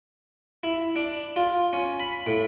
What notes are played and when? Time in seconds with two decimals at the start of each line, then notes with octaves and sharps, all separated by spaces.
0.63 E4
0.96 D4
1.36 F4
1.73 C#4
2.00 B5
2.27 A2